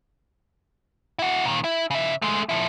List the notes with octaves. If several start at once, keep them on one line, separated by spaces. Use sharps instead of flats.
E4 F#4
A#2 D#3
E4
C#3 E5
G#3 A3
F3 E4